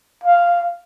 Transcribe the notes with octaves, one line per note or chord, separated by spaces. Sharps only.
F5